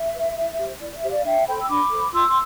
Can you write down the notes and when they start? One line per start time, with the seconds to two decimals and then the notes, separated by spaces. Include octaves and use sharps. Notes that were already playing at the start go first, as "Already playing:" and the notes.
Already playing: E5
0.14 B4
0.37 E4
0.59 G4 C5
0.81 E4 D5
0.95 E5
1.03 G4 C5
1.10 D5 F5
1.24 D4 E5 G5
1.47 A4 C5 G5 B5
1.61 E6
1.69 D4 B5 D6
1.91 A4 C5
2.13 F4 C6 E6